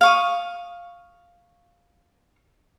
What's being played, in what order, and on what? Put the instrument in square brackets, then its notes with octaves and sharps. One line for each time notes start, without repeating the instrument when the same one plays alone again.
[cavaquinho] F5 C#6 D#6